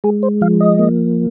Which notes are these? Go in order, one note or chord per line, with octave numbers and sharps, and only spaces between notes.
G#3 G#4
C5
F3 F5
D#5
A#3